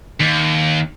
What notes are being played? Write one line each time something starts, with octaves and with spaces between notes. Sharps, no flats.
D#2